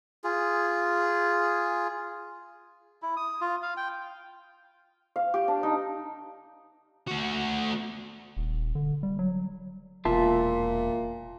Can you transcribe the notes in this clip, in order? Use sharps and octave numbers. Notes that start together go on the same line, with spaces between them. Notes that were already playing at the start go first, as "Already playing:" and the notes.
F4 G#4
E4
D#6
F4
F5
G5
F5
G4
D4
D#4
A3 F#4
D#1
D3
G3
F#3
E1 A#2 F4 E5 A5